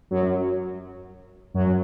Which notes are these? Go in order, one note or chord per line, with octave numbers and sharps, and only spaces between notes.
F#2 F#3
F#2 F#3